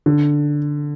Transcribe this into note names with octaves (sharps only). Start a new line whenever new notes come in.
D3